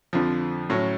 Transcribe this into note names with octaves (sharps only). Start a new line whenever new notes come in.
F2 D3 F3
A2 F#3 C#4